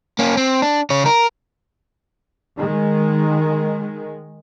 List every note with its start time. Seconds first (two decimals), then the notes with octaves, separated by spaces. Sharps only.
0.19 A#3 C#4
0.37 C4
0.62 D4
0.90 C#3 C#5
1.06 A#4
2.58 D#3 G#3